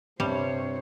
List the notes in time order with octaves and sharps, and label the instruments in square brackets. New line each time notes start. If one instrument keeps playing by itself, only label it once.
[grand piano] G2 C3 [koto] G3 [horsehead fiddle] C5 C#5